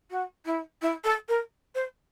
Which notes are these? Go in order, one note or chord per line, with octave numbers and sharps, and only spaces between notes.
F#4
E4
E4
A4
A#4
C5